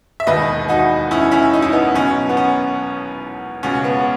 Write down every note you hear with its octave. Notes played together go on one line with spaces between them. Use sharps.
E5
E1 D#2 D#3 B4 D#5
D#4 F#4
C#4 E4
C#4 E4
D#4
E4
B3 D#4
B1 B2 C#4
B3
C#4
C#2 B2 C#4
B3